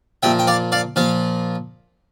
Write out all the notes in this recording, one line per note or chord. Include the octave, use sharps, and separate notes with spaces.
A#2 F3 E5 G5
G5
D5 F5
D5 F5
A#2 F3 F5